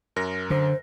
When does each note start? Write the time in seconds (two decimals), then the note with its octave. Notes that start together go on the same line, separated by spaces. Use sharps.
0.16 F#2 A#4 A#6
0.50 D3 C5